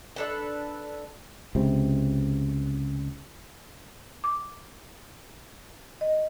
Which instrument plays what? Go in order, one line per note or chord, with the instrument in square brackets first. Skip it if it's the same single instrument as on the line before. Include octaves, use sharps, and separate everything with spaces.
[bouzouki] D4 A4 B4
[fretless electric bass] C#2 C3
[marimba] D6
D#5